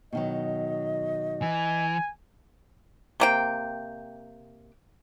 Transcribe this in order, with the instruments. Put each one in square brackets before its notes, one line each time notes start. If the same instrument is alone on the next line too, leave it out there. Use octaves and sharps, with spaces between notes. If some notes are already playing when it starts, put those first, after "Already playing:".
[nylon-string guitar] B2 D#3 F#3 [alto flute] D#5
[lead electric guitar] E3 [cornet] G#5
[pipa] C3 A#3 G5